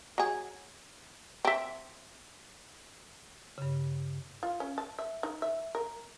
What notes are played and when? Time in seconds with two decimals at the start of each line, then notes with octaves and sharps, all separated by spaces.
0.18 F#3 G#4
1.45 C4 E5
3.58 G2 C#3
4.43 F4
4.60 C#4
4.78 A5
4.99 E5
5.23 D#4
5.42 E5
5.75 A#4